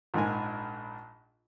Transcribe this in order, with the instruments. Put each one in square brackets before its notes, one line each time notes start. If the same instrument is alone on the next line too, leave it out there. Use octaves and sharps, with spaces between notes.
[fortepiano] A#1 G#2 A#4 G#5